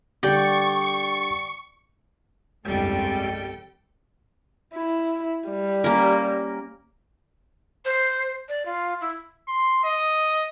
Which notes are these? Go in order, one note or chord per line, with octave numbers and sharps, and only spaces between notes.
D3 G3 D5 G5 C#6
G1 C2 F2 G3 G#3 A4 G5
E4
G3
A#3 C#4 A#4
C5
D5
F4
E4
C6
D#5